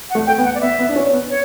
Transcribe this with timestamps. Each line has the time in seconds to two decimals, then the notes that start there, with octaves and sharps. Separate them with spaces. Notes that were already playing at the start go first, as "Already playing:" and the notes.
0.10 F#5
0.15 A3
0.27 A3 G5
0.38 B3
0.45 F#5
0.55 D5
0.61 B3 E5
0.79 B3
0.89 D4
0.96 C#4
1.13 B3
1.30 C#5